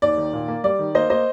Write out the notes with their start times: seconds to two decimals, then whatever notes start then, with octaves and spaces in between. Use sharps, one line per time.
0.02 D#2 D5
0.18 D#3
0.33 A#2
0.48 A#3
0.64 G3 D5
0.79 D#3
0.95 A#3 C5 D#5
1.10 A#3 C5 D#5